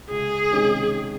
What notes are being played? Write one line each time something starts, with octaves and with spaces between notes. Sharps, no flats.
C#2 G#4
C3 D#3 G#3 C#4